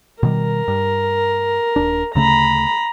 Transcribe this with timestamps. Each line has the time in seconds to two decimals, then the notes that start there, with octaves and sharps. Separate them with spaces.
0.23 B2 D#3 G3 A#4
0.68 G2
1.76 D#1 D4
2.15 D2 C#3 A3 A#5 B5